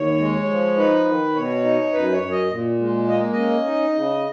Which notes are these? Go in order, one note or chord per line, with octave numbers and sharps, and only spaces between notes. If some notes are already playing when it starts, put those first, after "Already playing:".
Already playing: D#2 C#5
G#3
F3
D#4 B4
D#3
B2 C#5
D#4
F#2 B4
C#5
F#2
D#5
A#2
G#3
A#3 D#5
C#4 D#5
D#4
C#3